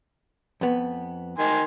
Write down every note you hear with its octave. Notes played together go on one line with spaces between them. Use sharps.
F2 B3
D#3 G#5 C6